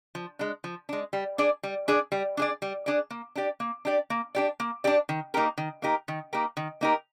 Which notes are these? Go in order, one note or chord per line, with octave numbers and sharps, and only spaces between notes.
F3
G#3 D4
F3
G#3 D4
G3
D4 G#4 D5
G3
D4 G#4 D5
G3
D4 G#4 D5
G3
D4 G#4 D5
A#3
D4 G4 D5
A#3
D4 G4 D5
A#3
D4 G4 D5
A#3
D4 G4 D5
D#3
A#3 D#4 G4 A#4
D#3
A#3 D#4 G4 A#4
D#3
A#3 D#4 G4 A#4
D#3
A#3 D#4 G4 A#4